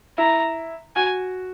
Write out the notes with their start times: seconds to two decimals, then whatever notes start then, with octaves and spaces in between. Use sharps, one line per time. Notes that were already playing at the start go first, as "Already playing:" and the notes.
0.18 E4 A#5
0.96 F#4 G#5